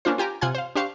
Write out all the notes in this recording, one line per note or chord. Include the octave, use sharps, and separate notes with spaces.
A#3 C#4 D4 F4 C5
F4 G4 G#5 A#5
C3 F4 F#5 G#5 G#6
C5 F5
D4 G4 C5 F5 C#6